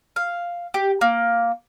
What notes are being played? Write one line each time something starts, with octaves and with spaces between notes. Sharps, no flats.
F5
G4
A#3